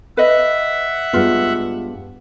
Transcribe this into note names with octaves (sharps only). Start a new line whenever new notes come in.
B4 D#5 E5 F#5
G2 G#3 B3 F4